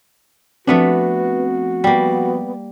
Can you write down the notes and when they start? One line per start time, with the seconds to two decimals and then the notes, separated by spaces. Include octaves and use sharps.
0.67 F3 A3 B3 C4 D4 F#4 B4
1.84 G3 A#3 B3